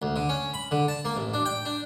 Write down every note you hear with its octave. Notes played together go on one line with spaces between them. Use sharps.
D2
D3
C#4
B5
D3
A5
A#3
A1
D4
G5
D4